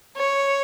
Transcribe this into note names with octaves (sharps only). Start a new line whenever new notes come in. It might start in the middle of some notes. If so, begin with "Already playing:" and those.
C#5